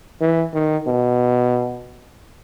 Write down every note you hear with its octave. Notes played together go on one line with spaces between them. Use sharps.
E3
D#3
B2